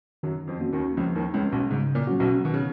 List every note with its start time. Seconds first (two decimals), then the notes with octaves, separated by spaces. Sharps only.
0.23 F#2 D#3 F#3
0.48 F2 F3
0.60 A#3 C#4 F#4
0.73 D#2 D#3
0.97 C#2 C#3 F3
1.15 D#2 D#3
1.34 C#2 C#3 G#3 C#4
1.52 B1 B2
1.71 G#2 C#3
1.95 A#2
2.07 F#3 C#4 F#4
2.20 B1 B2
2.45 B2 D#3
2.54 C#3